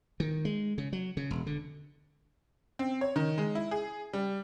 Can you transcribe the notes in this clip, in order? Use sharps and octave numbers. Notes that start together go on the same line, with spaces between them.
D#3
G#3
C#3
F#3
C#3
E1
D3
C4
C#5
D#3
G#3
E4
G#4
G3